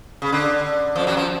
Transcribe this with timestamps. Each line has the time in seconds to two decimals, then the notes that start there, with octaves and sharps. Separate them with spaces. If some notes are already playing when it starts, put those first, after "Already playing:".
0.22 C#3
0.32 D3
0.95 F2 F3
1.07 F#2 F#3
1.17 F3